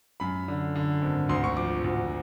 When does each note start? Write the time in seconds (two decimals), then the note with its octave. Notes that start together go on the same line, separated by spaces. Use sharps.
0.20 F#2 B5
0.48 D3
0.76 D3
1.02 G#1
1.29 D2 C6
1.44 C#6
1.57 F3 D6
1.84 D2